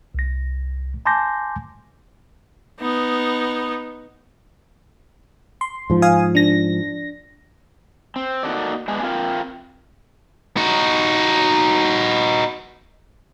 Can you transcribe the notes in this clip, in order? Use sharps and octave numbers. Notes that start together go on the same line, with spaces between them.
C2 A#6
G#5 A5 C6 D6 G6 A#6
B3 D#4
C6
G#2 F3
F5 G#5 D#6
D4 A#6
C4
A#3 D#4 F#4 A4 D5
G#3 B3 D4 G#4
C4 F4 A#4 G5
D#4 F#4